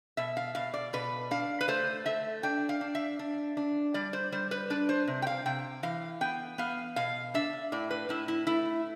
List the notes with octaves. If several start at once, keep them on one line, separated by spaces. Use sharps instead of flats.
B2 E5
F5
B2 F5
D5
B2 B4
D4 F5
B4
A3 C5
A3 E5
D4 G5
F5
D4
E5
D4
D4
G3 D5
C5
G3 C5
B4
D4 B4
C5
C3
G5
F5
C3 G5
E3 F5
B3 G5
B3 F5
B2 F5
D4 E5
A2 D5
B4
A2 E4
E4
A3 E4